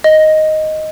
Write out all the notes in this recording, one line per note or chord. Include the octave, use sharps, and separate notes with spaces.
D#5